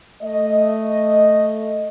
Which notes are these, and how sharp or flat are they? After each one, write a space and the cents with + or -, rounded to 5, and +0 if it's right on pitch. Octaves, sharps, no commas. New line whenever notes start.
A3 +0 D#5 +0